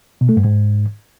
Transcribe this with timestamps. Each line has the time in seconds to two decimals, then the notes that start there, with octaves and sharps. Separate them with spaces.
0.21 B2
0.29 A3
0.37 G2
0.45 G#2